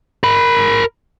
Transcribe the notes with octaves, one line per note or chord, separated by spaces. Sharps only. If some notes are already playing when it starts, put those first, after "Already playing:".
A#4 B5